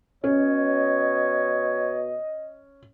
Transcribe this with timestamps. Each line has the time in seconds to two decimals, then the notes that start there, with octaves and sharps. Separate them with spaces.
0.24 B2 C#4 C#5 D#5